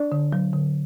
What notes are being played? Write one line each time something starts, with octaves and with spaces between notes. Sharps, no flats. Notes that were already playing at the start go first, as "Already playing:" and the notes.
Already playing: D4 D5
D3
F#3
D3